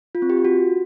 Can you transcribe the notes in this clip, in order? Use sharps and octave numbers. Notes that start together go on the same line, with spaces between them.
F4
C4
G4
F4
F#4